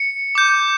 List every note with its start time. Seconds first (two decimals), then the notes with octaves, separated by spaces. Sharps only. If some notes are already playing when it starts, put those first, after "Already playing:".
Already playing: C#7
0.35 D6 G6